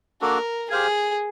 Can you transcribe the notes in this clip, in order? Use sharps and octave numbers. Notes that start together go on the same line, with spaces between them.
A#3 D4 F#4 A4 A#4 D5
G4 G#4 C5 F5 G#5